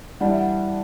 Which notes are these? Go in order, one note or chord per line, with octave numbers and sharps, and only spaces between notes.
E3 G3 D4 F#5
E5
F#5